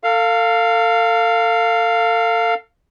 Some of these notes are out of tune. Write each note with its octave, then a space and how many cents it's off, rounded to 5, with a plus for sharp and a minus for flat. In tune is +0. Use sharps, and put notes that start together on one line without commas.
A4 +35 F5 +0